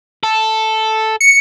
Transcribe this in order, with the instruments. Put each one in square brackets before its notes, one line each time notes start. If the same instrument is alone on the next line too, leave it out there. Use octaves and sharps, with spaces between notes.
[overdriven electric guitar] A4
[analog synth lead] C#7